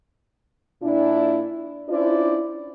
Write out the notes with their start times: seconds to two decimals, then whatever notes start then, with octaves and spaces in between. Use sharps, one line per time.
0.82 A#2 D4 E4
1.89 C#4 D4 E4 F4 C5 D5